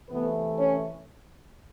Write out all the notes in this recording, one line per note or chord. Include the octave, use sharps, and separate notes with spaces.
C3 E3 A3 B3 B4
C#4 C#5